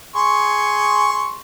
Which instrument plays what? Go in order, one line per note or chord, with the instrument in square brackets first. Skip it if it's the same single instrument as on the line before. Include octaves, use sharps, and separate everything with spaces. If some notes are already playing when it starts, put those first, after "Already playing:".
[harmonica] G#4 C6 C#6